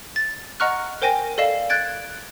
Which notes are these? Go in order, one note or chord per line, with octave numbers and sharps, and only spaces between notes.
A6
D#5 F#5 A#5 C#6 F6 F#6
A#4 C5 G5 G#5 A#6
A4 D5 D#5 F5 C7 E7
F#6 G#6 A6 D7